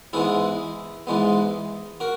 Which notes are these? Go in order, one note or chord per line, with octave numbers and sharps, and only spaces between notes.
G#2 E3 G#3 B3 E4 G#4
G#2 E3 G#3 B3
F#4 A#4